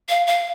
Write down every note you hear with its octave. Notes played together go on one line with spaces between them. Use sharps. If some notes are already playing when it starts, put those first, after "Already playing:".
F5
F5